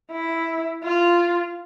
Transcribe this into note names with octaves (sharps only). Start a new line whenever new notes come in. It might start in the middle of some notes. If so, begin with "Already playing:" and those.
E4
F4